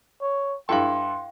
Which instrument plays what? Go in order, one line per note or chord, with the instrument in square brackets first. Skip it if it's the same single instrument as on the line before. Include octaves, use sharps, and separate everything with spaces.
[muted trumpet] C#5
[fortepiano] G2 E4 A4 [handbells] F5 G5 [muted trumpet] C6